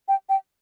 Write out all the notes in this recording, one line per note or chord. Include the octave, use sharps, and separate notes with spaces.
G5
G5